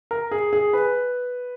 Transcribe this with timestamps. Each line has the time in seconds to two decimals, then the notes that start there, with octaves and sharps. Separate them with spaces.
0.11 A#4
0.31 G#4
0.53 G#4
0.73 B4